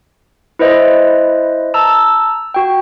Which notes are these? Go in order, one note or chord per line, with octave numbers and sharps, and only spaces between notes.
E4 B4 C5 D#5 E5
A5 A#5 E6
F#4 G5